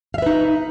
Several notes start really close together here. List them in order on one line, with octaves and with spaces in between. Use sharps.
F5 E5 B4 D#4